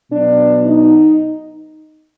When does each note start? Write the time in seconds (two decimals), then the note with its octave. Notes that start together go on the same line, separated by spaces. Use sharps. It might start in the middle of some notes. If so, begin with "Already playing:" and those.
0.10 B2 F#3 B3 D4
0.66 D#4